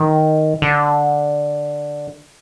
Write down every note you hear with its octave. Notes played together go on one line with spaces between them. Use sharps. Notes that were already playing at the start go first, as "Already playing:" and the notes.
Already playing: D#3
D3